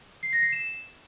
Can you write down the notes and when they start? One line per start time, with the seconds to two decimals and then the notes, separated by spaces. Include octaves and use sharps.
0.23 C7
0.33 A#6
0.43 C7
0.52 E7